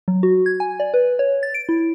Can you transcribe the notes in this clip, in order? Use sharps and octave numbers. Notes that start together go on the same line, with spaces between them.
F#3
F#4
G#6
G#5
D5
B4
C#5
A6
D7
E4